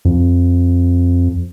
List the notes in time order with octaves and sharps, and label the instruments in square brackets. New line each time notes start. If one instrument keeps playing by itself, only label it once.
[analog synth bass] F2